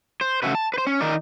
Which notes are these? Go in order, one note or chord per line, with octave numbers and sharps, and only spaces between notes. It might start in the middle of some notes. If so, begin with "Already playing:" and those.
C5
C#3 A3 C#4 E4 F#4 B4
A5
B4 C5
C#4
D#3 D#4 A#4 D5